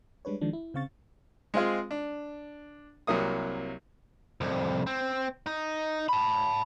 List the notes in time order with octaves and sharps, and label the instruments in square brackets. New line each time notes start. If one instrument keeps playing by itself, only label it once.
[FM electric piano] G3 G#3 D4 B4 C#5
D#3 F3 G#3 D4
E4
C#3 C4 F5 C#6 A6
[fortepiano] G#3 C4 F4 G#4
D4
C2 C3 F#3 A#3 D#6
[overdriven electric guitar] C2 F2
C4
D#4
A5 B5